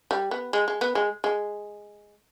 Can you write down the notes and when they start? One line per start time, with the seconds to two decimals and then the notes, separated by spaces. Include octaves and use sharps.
0.11 G3
0.31 B3
0.53 G#3
0.68 G#3
0.81 B3
0.95 G#3
1.24 G#3